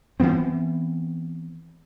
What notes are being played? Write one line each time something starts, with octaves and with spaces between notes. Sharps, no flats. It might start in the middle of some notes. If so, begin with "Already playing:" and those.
E3 F3 B3 C4